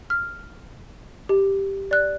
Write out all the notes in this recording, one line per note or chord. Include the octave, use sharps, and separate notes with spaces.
F6
G4
D5 F#6